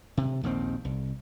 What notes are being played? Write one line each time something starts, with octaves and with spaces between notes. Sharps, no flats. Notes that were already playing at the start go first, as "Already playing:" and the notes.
C3
A#1 D#2 D#3 C4
C2